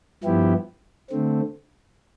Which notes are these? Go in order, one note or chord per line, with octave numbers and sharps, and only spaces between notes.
G2 F3 B3 E4 G4
D3 A3 C4